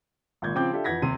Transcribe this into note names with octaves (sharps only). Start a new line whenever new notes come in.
G#1 A#2 G6 G#6
C#3 F3 C4 G5 D6 G6
D4 F4 G4 A4 E5
F2 E3 F#5 G#6 A#6 B6
D#1 C3 C6 D#7